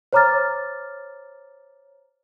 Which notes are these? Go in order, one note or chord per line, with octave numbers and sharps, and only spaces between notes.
C5 C#5 A#5 D6 F6 A6